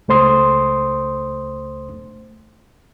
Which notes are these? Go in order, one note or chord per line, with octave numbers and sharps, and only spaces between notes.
C#2 A3 C5 C6 D#6